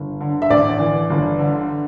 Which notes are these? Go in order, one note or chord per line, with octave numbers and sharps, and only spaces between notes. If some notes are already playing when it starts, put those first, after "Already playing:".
Already playing: G1
D3
E5
A1 D5
E3
G1
D3